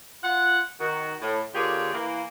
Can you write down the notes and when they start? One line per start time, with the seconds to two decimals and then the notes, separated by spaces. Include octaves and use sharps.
0.23 F4 F#5
0.80 D#3 F#4
1.22 A2
1.54 D3 A#3 F4 G4 G#4 C#5
1.93 E3 A#3